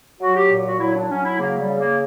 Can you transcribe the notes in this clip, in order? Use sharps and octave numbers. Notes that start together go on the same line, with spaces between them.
F#3 F#4
G4
A#2
F#4
F#3 E4
D4
F#3 C#4
E4
C#3 A#3
G3
C#3
A#3